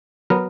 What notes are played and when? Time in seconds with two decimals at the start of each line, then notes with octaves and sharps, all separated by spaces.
0.30 F#3 B3 A#4